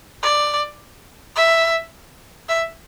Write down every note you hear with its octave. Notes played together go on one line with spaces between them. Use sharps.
D5
E5
E5